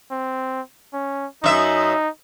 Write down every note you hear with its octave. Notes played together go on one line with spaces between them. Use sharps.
C4
C#4
F#2 D#4 E5